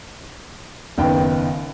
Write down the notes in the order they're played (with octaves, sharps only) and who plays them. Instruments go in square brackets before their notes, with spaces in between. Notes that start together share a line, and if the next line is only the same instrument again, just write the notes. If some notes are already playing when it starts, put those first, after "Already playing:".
[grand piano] F#1 D#3 B3 G5